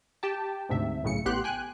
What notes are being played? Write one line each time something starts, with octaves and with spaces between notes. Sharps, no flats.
G4 G5 A5
D2 G#2 C3 E5
B1 A2 C#3 C#7
A1 A2 B3 G4 C6 F#6
G5 G#5 F#6